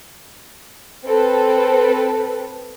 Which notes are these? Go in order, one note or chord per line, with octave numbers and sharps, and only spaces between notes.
C4 A4 B4